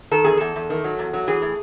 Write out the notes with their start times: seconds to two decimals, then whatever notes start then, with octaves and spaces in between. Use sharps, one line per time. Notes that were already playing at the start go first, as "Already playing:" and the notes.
0.11 D#3 A4
0.24 E2 G#4
0.37 E2 A4
0.56 E2
0.70 D#3
0.84 F#3
0.99 E2
1.13 F#3
1.27 E3 G#4
1.42 A2